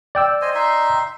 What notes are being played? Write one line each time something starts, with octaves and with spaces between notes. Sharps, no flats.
D5 G5 E6
C5 D#5 G#5
D#4 E5 C6